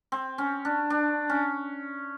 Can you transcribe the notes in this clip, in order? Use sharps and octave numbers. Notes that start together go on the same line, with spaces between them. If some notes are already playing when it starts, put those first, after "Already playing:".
C4
C#4
D4
D4
C#4